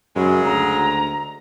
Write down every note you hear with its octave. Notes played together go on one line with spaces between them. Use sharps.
F#2 C#3 F#3 G#3
D2 A#5